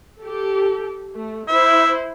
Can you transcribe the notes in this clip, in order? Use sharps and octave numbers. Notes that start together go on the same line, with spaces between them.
G4 A4
A3
E4 C5 E5